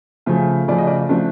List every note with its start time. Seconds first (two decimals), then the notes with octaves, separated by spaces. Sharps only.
0.26 C#3 F3 A3
0.68 C#3 F3 A3 D5
0.78 D#5
0.87 D5
1.09 F3 A3 D4 D5